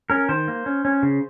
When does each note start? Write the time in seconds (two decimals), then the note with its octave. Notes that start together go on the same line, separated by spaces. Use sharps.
0.10 C#4 A#4
0.29 D#3 C5
0.48 A#3
0.66 C#4
0.85 C#4
1.03 C#3